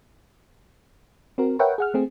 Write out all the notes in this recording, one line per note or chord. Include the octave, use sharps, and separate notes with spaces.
C4 F#4 A#4
A#4 B4 C#5 E5 F#5 G5
G#4 F#5 F6
A3 C4 G#4